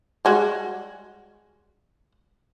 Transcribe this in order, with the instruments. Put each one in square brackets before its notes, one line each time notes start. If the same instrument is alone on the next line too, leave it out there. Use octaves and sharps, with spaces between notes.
[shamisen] G3 G#3 F#4